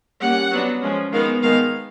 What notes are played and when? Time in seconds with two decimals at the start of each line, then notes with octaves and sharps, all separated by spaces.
0.21 G3 A#3 C#4 F#5
0.51 F#3 B3 D4
0.82 F3 G#3 C#4
1.12 D#3 G#3 B3 F5
1.42 D#3 G#3 B3 F5